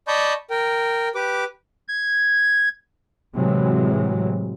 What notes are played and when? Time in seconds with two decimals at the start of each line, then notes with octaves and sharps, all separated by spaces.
0.08 D5 D#5 A5 B5 C#6 G6
0.51 A#4 G5
1.15 G4 B4 D6
1.88 G#6
3.34 A2 C3 E3 F#3 G#3